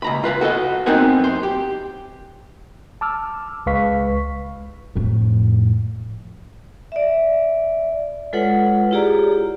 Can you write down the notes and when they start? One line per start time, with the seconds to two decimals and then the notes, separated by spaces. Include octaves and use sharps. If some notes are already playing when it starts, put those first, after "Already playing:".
0.02 C#2 A#5 B5
0.24 F4 B4 F5
0.41 F#4 A4 B4 D#5
0.86 B3 C4 D#4 A#4 F#5 G#5
1.19 F#2 C5
1.43 G4
3.01 A5 D6 E6 F6
3.66 C#2 G#3 B4 F5 C#6 B6
4.95 F2 A2
6.92 D5 E5
8.33 G#3 F4 A4 B4 C#5 F#5
8.91 E4 F4 G4 G#4 D5 A#5